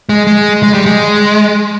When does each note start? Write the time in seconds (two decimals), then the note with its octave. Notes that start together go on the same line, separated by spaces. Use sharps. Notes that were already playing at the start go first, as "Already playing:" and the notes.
0.09 G#3
0.27 G#3
0.63 G#3
0.74 G3
0.86 G#3